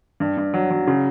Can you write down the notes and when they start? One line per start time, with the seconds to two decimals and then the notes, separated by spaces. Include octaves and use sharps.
0.20 G2
0.37 G2
0.54 F#3
0.71 F#3
0.87 C#3